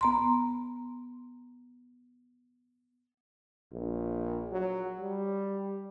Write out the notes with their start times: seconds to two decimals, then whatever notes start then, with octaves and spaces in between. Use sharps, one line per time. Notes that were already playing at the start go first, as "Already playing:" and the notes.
0.01 B3 A#5 C6
3.72 A#1
4.52 F#3
5.00 G3